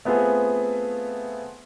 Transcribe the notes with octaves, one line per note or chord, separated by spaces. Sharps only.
A3 B3 C4 F4 G#4